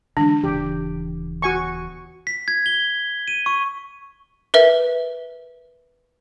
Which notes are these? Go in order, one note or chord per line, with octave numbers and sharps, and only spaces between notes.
D3 E3 G#3 D4
D#1 C#3 E3 G4
F#4 G#5 C#6
B6
G#6
G7
D#7
C#6
A#4 B4 E5